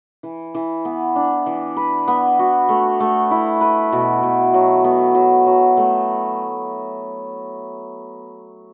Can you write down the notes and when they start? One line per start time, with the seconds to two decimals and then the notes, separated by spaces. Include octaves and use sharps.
0.23 E3
0.55 E3
0.85 B3
1.16 D4
1.46 E3
1.77 B4
2.08 B3
2.39 F#4
2.69 A3
3.00 A3
3.31 E4
3.61 B4
3.92 B2
4.23 B2
4.54 F#3
4.84 B3
5.15 F#3
5.46 F#3
5.77 A3